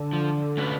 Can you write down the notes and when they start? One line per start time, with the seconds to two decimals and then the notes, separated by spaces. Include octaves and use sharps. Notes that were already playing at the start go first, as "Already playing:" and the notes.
Already playing: D3
0.13 F3
0.57 A3 C#4 F#4 B4